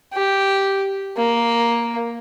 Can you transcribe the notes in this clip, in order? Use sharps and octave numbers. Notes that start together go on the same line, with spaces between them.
G4
A#3